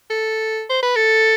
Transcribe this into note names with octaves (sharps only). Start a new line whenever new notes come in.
A4
C5
B4
A4